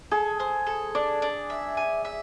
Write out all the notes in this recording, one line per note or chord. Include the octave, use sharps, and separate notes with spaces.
G#4 A4
C5
A4
D4 D5
D4
E5
G#5
E5